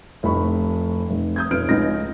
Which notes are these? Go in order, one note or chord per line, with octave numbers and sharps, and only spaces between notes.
F1 F2 A2 B5 C#6
F1
D#6 G6 G#6
F1 C#4 F4 B4 F6 D7
C#2 A2 C#4 D#4 A#6